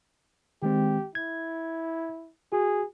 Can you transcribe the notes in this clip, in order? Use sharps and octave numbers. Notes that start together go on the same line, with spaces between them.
D#3 G#3 C4 G4
E4 G#6
F#4 G#4